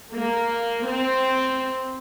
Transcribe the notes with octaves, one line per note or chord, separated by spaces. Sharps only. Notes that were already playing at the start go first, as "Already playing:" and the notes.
A#3
C4